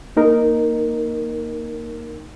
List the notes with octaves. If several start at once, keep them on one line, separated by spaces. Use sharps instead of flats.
A#3 D#4 A#4